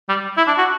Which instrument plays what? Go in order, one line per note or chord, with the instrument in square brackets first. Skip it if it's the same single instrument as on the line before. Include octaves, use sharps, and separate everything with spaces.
[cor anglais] G3
E4
D4
F#4